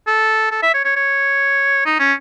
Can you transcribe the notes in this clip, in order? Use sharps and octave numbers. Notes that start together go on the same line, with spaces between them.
A4
A4
E5
C#5
C#5
C#5
D#4
C#4